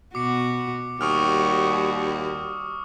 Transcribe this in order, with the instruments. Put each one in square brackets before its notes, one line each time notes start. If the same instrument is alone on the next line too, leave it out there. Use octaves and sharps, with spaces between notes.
[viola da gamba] B2 F#4 [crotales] D6 C#7
[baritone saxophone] D#2 [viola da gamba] G3 F#4 [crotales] C#6 D#6 F6